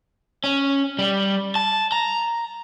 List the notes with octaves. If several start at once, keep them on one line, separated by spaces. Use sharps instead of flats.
C#4
G3
A5
A#5